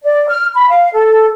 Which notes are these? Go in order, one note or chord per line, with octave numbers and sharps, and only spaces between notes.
D5
F6
B5
F5
A4